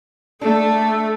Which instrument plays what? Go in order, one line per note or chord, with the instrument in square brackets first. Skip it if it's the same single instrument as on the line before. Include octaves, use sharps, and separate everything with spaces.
[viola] A3 A4 [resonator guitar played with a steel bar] D4